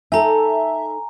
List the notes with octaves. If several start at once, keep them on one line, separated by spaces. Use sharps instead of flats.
D#4 A4 E5 G#5 A#5